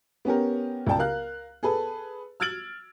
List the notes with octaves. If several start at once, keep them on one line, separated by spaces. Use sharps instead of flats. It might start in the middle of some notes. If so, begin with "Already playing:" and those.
B3 C#4 G4 A#4
C#2 D5 G5 A5
A#4 F5 F#6
G#4 A4 B4
E6 F6 G#6 A6 D7 F#7